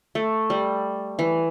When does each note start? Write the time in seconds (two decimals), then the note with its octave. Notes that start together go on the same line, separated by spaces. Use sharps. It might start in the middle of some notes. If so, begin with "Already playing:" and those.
0.15 A3
0.50 G3
1.19 E3